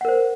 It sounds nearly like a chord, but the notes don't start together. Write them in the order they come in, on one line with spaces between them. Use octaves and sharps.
F#5 A#4 C5